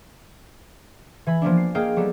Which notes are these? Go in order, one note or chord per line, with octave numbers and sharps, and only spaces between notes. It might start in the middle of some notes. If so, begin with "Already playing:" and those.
E3 G#5 B5
F3 A#3 B3 D4
C7
A#3 G#4 D#5 F5 G5
F#3 G3 B3 A4